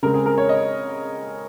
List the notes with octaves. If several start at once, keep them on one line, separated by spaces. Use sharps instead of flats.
C#3 G#3 C4 A#4
G#4
A#4
C#5
D#5